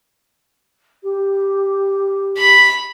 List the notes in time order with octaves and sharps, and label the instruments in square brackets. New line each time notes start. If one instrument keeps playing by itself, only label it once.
[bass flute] G4
[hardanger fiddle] B5